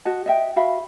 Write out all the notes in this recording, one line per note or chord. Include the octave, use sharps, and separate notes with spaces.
F#4 D#5 A5
D#5 E5 G5
F#4 E5 F5 B5